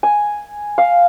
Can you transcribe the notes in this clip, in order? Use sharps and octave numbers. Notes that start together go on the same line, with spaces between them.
G#5
F5